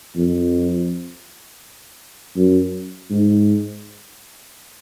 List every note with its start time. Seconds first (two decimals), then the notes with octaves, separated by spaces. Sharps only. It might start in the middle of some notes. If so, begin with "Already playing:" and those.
0.16 F2
2.36 F#2
3.10 G#2